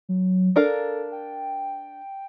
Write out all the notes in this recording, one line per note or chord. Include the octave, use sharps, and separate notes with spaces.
F#3
D4 A4 A#4 F5
G5